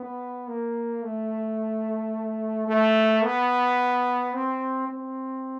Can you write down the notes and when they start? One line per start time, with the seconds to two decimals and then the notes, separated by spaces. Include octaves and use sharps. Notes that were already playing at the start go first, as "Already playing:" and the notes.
Already playing: B3
0.48 A#3
1.03 A3
2.67 A3
3.24 B3
4.34 C4
4.89 C4